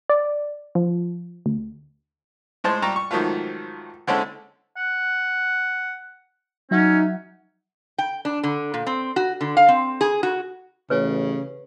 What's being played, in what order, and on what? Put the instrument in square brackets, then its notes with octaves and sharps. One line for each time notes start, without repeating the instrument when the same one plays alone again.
[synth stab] D5
F3
D2
[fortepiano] A2 G#3 C5 A5
G3 G4 A#5 C#6
C#6
G#2 D#3 F3 F#3 A3 F4
D3 G#3 C4 C#4 E4 A4
[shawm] F#5
[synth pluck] F#3 E5 F#5 [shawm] C#4 [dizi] D#4
[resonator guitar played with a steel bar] G5
D4
D3
A#2
C4
F#4
D3
F5
C4
G#4
F#4
[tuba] A1 [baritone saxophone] C#3 [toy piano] B4 C#5